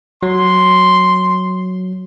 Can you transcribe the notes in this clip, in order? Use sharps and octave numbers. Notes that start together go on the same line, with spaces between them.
F#3 C6